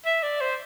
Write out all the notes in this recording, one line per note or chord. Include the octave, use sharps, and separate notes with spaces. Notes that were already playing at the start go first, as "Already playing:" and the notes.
E5
D5
C5